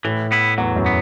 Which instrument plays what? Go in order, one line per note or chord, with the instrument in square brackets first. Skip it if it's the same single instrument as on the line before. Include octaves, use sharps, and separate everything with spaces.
[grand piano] A2 [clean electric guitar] E3
[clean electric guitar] B3 E4
[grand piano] E2 [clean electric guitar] F#3
[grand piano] F#2
[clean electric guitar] B3